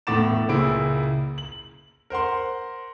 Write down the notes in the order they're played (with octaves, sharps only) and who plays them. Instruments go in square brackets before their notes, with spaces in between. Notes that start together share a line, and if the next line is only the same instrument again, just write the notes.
[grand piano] E1 A2 B3 D6 A6 E7
C#2 A#2 C#3 E4 D7
F#7
A#4 C5 F#5 C6